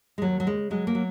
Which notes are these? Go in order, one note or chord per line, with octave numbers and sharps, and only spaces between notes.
G#3
D#2 F#3
F#3
C#3 G#3
F#3 G#3
A#3
F#3